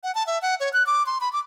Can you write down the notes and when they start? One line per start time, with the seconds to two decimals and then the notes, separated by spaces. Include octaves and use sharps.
0.03 F#5
0.15 A5
0.27 E5
0.42 F#5
0.60 C#5
0.73 F#6
0.87 D6
1.06 C6
1.21 B5
1.33 D6